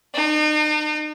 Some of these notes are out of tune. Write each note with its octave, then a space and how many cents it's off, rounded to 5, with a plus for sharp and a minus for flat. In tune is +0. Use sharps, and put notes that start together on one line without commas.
D#4 -40